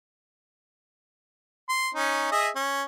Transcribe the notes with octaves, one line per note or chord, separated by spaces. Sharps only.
C6
C#4 D#4
G#4 D#5 E5
C#4